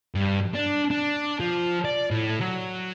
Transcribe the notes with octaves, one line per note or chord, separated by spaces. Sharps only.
G2
D4
D4
F3
D5
A2
F#3